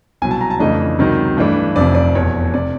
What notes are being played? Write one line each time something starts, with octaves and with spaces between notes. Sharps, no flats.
C2 B2 F#3 G#5
A5
A#5
A5
F2 C#3 E3 A3 D4 D#5
C#2 C3 D#3 F#3
G2 E3 A3 D4
F1 F2 C3 D5
D5
F1 E2 B2 C#5
C3 D5